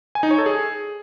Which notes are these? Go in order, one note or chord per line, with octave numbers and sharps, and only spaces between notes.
G#5
D#4
C#5
A4
G#4